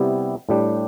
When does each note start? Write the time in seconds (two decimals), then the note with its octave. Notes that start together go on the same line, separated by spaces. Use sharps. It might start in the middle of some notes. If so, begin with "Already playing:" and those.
Already playing: C3 G3 B3 E4 G4
0.49 A2 G3 D4 G4